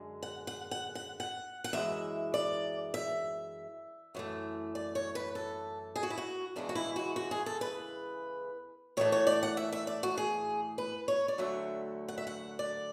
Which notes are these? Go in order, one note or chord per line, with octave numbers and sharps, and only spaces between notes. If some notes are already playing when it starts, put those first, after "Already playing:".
Already playing: F#2 D3 G#3
F#5
F#5
F#5
F#5
F#5
F#5
F#2 E3 G#3 E5
D5
E5
F#2 E3 A3
D5
C#5
B4
A4
G#4
F#4
E4
F#4
E2 C#3 E3 G#3 D4
F#4
E4
F#4
F#4
G#4
A4
B4
A2 E3 A3 C#5
C#5
D5
F#5
E5
E5
D5
F#4
G#4
B4
C#5
D5
D2 D3 F#3 A3 E5
F#5
E5
F#5
D5